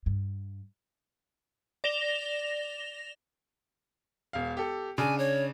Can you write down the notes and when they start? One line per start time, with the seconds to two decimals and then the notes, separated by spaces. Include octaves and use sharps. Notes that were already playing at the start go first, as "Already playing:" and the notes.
0.06 G2
1.84 D5 A#6 E7 F7 G7
4.33 E1 F5
4.57 G4 A4
4.98 C#3 D4 G#5
5.18 C#5